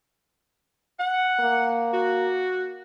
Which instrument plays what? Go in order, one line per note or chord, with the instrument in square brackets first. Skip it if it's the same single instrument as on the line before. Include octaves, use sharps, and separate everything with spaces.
[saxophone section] F#5
[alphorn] A#3
[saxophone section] F#4